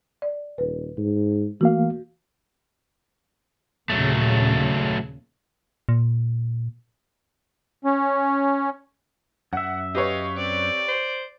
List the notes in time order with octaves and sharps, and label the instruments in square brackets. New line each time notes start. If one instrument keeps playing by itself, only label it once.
[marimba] D5
[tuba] D#1 [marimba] B4
[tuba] G#2
[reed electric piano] E3 A#3 F5 [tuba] A3 [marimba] F#4
[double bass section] D#2 A#2 C#3 [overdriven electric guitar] F#3 A3
[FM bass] A#2
[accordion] C#4
[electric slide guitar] F#2 E5 [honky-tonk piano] F#5
[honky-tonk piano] G4 B4 C#5 [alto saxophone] D#5 [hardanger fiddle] F5
[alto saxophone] C4 [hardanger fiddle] D5
[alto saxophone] C5